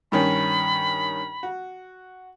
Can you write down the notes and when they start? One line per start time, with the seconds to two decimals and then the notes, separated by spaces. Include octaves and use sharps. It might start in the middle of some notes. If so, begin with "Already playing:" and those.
0.12 G2 D#3 C#4 B5
1.43 F#4